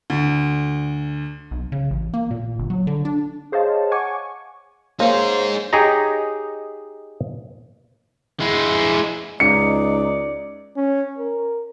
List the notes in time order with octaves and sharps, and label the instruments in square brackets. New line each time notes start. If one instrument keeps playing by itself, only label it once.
[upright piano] D2
[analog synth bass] B1
C#3
A1
A#3
A#2
G1
F#3
D3
D4
[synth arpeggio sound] G#4 C5 C#5 D#5 F5 A5
F#5 G#5 C#6 D6
[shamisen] A#3 [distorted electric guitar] D#4 G#4 [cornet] C5 [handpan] C#5
[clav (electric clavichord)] D#4 G4 G#4 C#5 D#5 A#5
[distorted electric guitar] G#3 E4
[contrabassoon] C#2 [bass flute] D#4 [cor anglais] D5 [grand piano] C#7
[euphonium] C#4
A#4